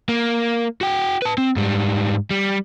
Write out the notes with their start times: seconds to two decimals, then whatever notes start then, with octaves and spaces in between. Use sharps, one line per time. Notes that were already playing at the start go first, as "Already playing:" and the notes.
0.09 A#3
0.81 F#4 G5
1.22 B4 A5
1.38 C4
1.56 G#2 G3
2.31 G3